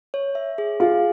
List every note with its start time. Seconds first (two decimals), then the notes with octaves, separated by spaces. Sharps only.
0.14 C#5
0.35 E5
0.58 G#4
0.80 F4 G#4